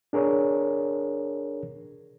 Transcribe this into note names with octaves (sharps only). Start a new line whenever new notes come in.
D4 G#4 A#4 C#5